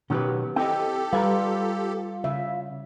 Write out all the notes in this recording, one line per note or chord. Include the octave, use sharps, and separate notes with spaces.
B2 D#3 F#3 C#4 G4 B4
C4 E4 G4 A4 D#5 G5
G3 F4 B4 G#5 A#5
C#3 E5